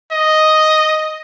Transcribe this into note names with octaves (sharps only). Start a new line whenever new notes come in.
D#5